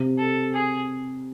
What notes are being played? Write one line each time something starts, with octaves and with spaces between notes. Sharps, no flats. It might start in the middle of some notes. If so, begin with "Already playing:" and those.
Already playing: C3
A4
G#4